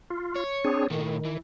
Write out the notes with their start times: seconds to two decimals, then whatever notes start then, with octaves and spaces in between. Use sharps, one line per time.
0.10 F4
0.35 C#5
0.64 C4 D4 G#4
0.90 A#2 D#3 A3
1.25 E3